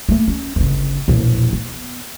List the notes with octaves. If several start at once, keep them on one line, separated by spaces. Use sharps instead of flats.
A3 A#3
C#4
G1 C#3
E1 A#1
B3